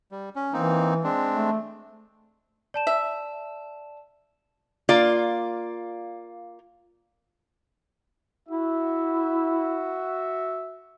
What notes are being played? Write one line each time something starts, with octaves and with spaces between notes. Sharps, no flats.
G3
C#4
E3 A#3 C4 D#4
G#3 C4 D4
A3
D5 A5 E7
E5
A#3 F4 D5
E4 F#4 E5